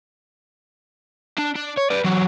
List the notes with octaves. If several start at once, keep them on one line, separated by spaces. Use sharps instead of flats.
D4
D4
C#5
B4 D5
E3 F#3